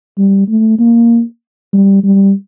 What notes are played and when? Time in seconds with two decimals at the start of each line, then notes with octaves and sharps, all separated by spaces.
0.17 G3
0.48 A3
0.79 A#3
1.73 G3
2.04 G3